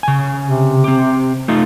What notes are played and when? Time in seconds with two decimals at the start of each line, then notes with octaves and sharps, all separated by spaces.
0.03 C#3 G#5
0.43 C3
0.84 C4 G4
1.48 A3 D#4 F4